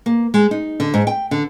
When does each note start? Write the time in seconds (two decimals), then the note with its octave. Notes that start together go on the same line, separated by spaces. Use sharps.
0.06 A#3
0.34 G#3
0.51 D#4
0.80 D3
0.94 G#2
1.07 G5
1.31 D3